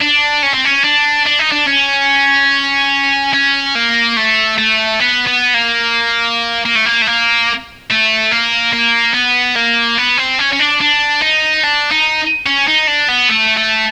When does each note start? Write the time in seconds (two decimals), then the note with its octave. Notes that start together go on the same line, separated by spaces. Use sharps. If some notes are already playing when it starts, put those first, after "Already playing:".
0.01 D4
0.43 C#4
0.54 C4
0.65 C#4
0.84 D4
1.26 D4
1.39 D#4
1.51 D4
1.67 C#4
3.34 C#4
3.75 A#3
4.17 A3
4.58 A3
5.00 B3
5.27 B3
5.54 A#3
6.65 A#3
6.75 A3
6.86 A#3
7.02 A3
7.07 A#3
7.90 A3
8.31 A#3
8.73 A#3
9.14 B3
9.56 A#3
9.98 B3
10.18 C4
10.39 C#4
10.52 C#4
10.59 D4
10.81 D4
11.22 D#4
11.64 D4
11.91 D#4
12.46 C#4
12.68 D#4
12.87 D4
13.09 B3
13.29 A3
13.57 A3